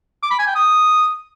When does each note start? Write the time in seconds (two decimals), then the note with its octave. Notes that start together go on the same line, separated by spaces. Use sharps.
0.23 D6
0.31 B5
0.39 G#5
0.47 G5
0.55 D#6